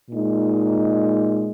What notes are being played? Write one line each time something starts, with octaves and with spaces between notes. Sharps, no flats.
A#2 G#3 D#4